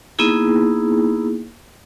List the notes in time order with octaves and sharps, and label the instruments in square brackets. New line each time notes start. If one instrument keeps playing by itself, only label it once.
[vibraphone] A#3 B3 D#4 E4 G#4